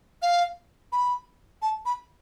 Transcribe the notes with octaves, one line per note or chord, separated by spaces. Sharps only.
F5
B5
A5
B5